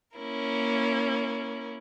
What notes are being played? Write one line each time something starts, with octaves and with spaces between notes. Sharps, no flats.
A#3 C#4 E4 A#4